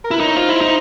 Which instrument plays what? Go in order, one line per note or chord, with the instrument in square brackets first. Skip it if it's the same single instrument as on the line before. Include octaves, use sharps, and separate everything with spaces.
[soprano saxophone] A#4
[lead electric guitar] E4 [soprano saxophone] B4
[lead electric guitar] D#4 [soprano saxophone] C#5
[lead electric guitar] F4 [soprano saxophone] C5
[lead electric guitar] E4
D#4